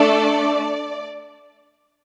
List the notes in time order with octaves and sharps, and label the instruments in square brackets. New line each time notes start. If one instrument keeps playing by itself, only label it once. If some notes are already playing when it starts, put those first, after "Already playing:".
Already playing: [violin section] A3 D4 A4 D5